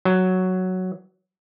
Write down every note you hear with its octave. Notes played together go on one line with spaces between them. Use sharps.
F#3